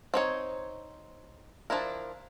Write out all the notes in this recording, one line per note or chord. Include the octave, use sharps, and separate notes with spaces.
C4 D#4 C#5
F3 D4 E4 A#4